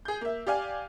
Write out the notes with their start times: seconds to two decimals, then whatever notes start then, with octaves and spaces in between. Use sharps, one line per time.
0.05 G#4 G6
0.21 A#3 E5
0.47 G4 D5 F5 G#5